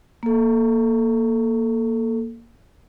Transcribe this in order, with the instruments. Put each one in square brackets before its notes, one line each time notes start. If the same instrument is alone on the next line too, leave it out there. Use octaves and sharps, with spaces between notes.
[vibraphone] A#3 A4